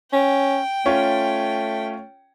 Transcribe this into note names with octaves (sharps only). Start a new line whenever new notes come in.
C#4 G5
A3 C#4 F4 C#5